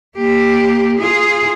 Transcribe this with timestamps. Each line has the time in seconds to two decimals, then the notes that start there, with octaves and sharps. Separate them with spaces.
0.17 A#3 G4
0.99 F4 G#4